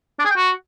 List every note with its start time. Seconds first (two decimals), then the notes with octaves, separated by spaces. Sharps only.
0.19 D4
0.25 G#4
0.30 G5
0.36 F#4